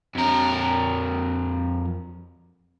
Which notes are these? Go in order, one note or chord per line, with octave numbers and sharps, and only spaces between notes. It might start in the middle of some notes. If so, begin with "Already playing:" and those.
F2 A#4